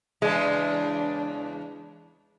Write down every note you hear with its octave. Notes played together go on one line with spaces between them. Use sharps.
E2 C#3 G#3 D4